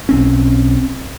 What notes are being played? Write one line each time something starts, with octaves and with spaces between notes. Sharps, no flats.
B1 C4 C#4